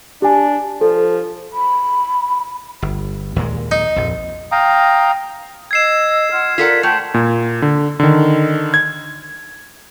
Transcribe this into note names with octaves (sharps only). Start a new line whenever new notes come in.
D4 G4 G#5
F3 A4
B5
G1
D#2 A#2 G#3
D#4
A#1 F2
F5 G5 A#5 D#6
D#5 E6 G#6 C7 E7
F4 F#5 F6
F4 A4 A#4 D5 F#5 B6
A3 C5 F#5 G5 A5
A#2
D3
D3 D#3
G#6